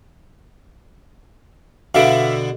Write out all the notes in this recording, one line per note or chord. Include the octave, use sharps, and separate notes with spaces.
B2 D3 F#4 E5 F5